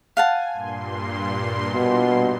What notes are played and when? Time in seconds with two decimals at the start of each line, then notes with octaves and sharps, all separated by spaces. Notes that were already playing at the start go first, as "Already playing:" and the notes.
0.17 F5 F#5 G#5 A5
0.54 G2 A#2 C6
1.74 B2